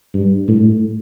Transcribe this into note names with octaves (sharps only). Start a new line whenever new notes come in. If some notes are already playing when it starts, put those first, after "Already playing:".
G2
A2